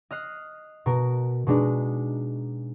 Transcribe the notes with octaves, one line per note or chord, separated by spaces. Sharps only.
D#5 F6 F#6 C7
B2 A#4
B2 G#3 D4 D#4